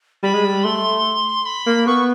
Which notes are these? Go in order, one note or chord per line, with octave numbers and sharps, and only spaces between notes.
G3 B5
G#3
G3
A3 C6
B5
A#3
B3 C#6